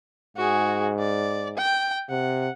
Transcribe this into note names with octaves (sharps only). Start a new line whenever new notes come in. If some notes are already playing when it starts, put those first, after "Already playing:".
G#2 F#4 G#4
D5
G5
C3 F#5